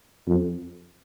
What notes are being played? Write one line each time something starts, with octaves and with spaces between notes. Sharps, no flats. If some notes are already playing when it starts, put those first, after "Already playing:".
F2